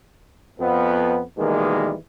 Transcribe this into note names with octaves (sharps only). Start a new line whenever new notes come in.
F2 B3
B2 D#3 E3 G3 G#3 A#3